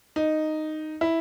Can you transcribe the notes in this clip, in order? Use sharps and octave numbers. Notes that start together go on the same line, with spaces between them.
D#4
E4